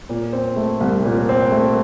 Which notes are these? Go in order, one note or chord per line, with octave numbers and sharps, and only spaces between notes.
A#2
C4
A3
C2
A#2
C4
A3